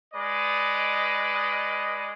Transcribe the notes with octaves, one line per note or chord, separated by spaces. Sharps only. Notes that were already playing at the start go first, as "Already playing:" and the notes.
G#3 B4 D5 D#5